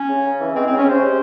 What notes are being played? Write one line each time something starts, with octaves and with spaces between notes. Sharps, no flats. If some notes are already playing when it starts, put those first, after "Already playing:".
Already playing: C#4
C#3
C#3
E3
G#3 C4
C#3 C4
C#4
C#3 C5
C3